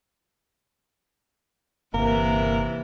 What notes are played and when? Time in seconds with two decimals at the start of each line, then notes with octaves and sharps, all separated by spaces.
1.94 G1 C3 E3 A#3 E4 A#4